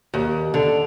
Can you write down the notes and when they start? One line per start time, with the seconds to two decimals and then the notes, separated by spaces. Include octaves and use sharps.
0.14 D#2
0.54 D3